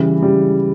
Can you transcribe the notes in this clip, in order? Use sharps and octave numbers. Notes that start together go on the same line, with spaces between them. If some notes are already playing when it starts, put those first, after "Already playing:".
Already playing: C#3 E3 G3
C#3 E3 G3